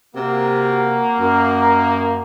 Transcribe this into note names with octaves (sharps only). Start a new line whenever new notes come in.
C3 A#3 F#4
F#2 A#4